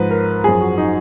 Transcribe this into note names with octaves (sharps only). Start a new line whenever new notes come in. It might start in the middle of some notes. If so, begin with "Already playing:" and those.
Already playing: G#2 F3 B4
A#4
F#2 F3 G#4
F#4
D#4